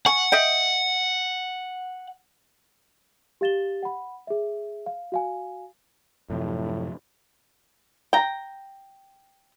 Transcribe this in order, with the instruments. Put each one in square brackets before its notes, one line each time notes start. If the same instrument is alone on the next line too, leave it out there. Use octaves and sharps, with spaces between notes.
[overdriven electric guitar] F#5 [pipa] G#5 C#6
[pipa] D#5 E5 G5
[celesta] G4 F5 A6 E7 G7
F#5 B5
G#4 E5
F5
F#4 F5 G#5
[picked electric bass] F#2 C3 F3 [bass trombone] A2
[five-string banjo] G5 A#5